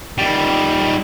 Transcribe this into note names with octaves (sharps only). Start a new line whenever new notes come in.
D#3 G3